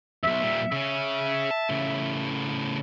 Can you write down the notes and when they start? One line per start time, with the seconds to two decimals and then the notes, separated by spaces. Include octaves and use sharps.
0.23 B1 F2 E5
0.42 A#2 G3
0.72 C#3 C#4 E5
1.51 A5
1.69 A2 C#3